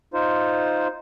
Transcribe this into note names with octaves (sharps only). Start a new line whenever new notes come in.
D#4 F4 C5